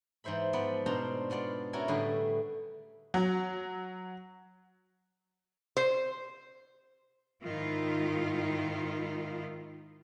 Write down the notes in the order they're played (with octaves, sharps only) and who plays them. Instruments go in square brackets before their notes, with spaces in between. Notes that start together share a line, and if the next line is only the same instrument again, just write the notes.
[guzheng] G#2 E3 C5 E5 B5
F3 B3 B4 D5
B2 D4 F4 C5 A#5 C6
G#3 B3 F4 D5
C#4 E4 F#4 A#4 G#5 A5
A2 D3 G3 G#4 B4
[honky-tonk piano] F#3
[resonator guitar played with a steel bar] C5
[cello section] G#2 D#3 E4 F4